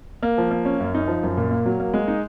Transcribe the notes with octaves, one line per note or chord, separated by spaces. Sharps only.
A#3
F3
A#3
C#4
F#2
D#4
F3
F#2
A#2
A#3
F#3
A#3
G#3
D#4